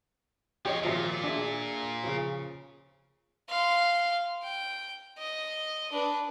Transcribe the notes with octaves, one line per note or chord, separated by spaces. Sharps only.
F3 C#4 G4 C#5 D#5
G#1 A#2 F3 E5
D4 G#4 E5
C#3 F3
F5 C6
G5
D#5
D4 B4